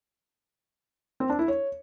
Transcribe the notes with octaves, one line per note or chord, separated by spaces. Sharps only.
C4
D4
E4
C#5